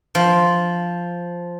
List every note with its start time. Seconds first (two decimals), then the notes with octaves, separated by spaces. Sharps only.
0.15 F3